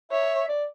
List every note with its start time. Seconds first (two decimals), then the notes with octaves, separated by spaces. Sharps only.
0.11 C#5 E5
0.48 D5